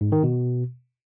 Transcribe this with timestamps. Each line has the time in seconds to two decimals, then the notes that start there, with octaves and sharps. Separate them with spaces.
0.01 G#2
0.12 D#3
0.23 B2